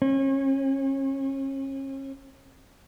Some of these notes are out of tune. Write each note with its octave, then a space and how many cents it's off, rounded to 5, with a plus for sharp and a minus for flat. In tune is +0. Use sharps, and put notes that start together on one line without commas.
C#4 -35